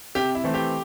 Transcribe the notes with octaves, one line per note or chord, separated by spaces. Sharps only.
C3 G4
E4
E3 A3 C4
G4